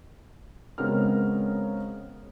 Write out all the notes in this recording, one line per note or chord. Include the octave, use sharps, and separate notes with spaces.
C#3 G#3 B3 C4 A#4 F6